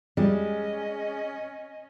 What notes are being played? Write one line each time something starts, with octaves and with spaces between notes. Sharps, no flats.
F2 G3 G#3 C#4 D#5